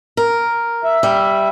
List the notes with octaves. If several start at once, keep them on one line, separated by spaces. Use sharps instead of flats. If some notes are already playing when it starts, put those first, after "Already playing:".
A#4
E5
G3